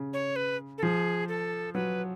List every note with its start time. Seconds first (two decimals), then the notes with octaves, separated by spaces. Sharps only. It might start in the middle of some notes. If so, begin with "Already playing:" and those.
Already playing: C#3
0.13 C#5
0.36 B4
0.78 A4
0.83 F3 G#4
1.28 A4
1.74 F#3 B4